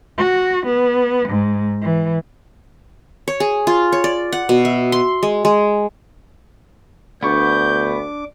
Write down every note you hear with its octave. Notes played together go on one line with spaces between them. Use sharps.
F#4
B3
G#2
E3
C#5
G#4
F4
C#5
D5
F#5
B2
E5
C6
G#3
G#3
D2 B3 D4 C#6 D6 G6